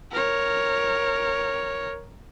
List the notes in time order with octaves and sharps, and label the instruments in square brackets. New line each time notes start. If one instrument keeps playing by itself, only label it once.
[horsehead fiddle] A#4 C#5